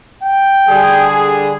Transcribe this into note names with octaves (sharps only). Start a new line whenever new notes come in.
G5
D3 G3 G#4